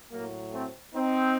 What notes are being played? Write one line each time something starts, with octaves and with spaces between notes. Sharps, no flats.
A2 F#3 A#3
A3 C4
C4 D#4